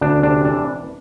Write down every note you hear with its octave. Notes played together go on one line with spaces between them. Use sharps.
D2 D4
C3 D4
E3 D4